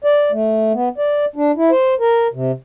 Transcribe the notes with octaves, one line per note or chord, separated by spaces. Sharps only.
D5
A3
B3
D5
D4
E4
C5
A#4
C3